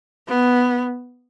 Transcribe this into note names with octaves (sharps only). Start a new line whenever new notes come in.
B3